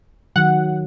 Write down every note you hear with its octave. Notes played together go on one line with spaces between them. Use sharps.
D#3 F#3 F#5